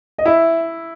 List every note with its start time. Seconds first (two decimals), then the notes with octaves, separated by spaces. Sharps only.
0.18 D#5
0.25 E4 E5